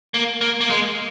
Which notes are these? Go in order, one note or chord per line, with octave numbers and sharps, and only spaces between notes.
A#3
A#3
A#3
G#3